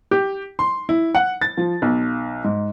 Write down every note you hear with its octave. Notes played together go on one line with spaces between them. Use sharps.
G4
C6
E4
F#5
A6
F3
B1
G#2